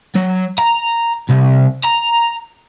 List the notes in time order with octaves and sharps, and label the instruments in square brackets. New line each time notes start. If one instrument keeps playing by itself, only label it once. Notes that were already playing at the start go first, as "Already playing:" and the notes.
[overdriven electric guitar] F#3
A#5
C2
A#5